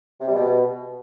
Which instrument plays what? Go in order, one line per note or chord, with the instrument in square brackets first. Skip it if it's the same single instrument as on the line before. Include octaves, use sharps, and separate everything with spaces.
[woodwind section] C3
G3
B2